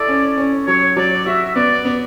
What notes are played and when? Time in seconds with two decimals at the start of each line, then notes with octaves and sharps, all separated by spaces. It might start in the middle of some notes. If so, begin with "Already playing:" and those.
Already playing: E4 A4 D5
0.08 C#4
0.38 C#4
0.67 F#3 C#5
0.97 F#3 D5
1.26 F#4 E5
1.56 B3 D5
1.85 B3